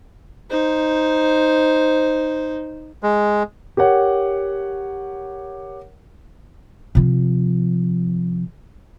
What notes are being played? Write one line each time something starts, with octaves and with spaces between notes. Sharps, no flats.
D#4 C5
G#3
G4 A#4 C#5 F#5
C3 F3